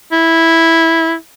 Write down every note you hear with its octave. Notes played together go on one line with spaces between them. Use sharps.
E4